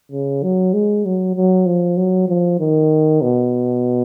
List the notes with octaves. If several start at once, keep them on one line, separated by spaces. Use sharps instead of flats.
C#3
F#3
G#3
F#3
F#3
F3
F#3
F3
D#3
B2